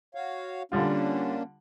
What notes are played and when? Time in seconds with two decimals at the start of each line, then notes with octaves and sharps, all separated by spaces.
0.15 F#4 C#5 F5
0.72 D3 G3 A#3 C#4 D4 F4